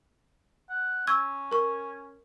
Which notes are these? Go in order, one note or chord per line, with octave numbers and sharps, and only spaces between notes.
F#5
C#4 C#6 E6 G#6
A#4 C#6